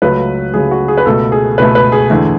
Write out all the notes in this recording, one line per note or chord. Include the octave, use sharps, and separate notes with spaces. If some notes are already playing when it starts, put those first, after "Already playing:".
C#2 C#3 F#3 A3 B4
C#2 C#3 F#3 A3 G#4
F#4
G#4
B4
C#2 B2 A3 A4
G#4
C#2 B2 A3 B4
B4
G#4
E2 D3 A3